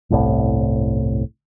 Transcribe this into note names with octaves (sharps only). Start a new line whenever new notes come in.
G1 C2 A2